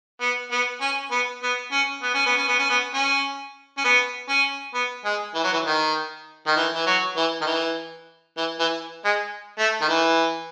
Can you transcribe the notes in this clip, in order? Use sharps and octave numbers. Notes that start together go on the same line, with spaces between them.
B3
B3
C#4
B3
B3
C#4
B3
C#4
B3
C#4
B3
C#4
B3
C#4
C#4
B3
C#4
B3
G#3
E3
F#3
E3
D#3
D#3
E3
E3
F#3
E3
D#3
E3
E3
E3
G#3
A3
D#3
E3